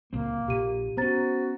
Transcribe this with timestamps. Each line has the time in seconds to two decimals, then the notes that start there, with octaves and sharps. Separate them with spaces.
0.13 C#2 A#2 A#3 C4
0.48 A#1 A#2 G4 D#7
0.97 B3 C#4 F#4 C5 A#5 A6